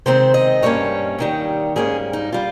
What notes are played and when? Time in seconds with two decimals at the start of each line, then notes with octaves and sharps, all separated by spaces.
0.06 C3 D#3 G#3 C4 C5
0.34 D#5
0.62 G2 G3 A#3 C#4 C#5
1.18 D#2 D#3 G3
1.76 G#2 G3 A#3 C#4 G#4
2.13 D#4
2.33 G3 F4